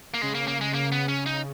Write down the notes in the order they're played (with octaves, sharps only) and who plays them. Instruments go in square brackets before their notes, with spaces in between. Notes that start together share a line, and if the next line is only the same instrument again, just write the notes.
[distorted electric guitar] A#3
[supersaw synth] C#3 [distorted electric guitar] G#3
[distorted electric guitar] A#3
A#3
G#3
A#3
B3
C#4
D#4